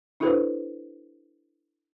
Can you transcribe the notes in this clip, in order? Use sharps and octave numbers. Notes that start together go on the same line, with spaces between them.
D4 E4 F#4 A4 B4 C5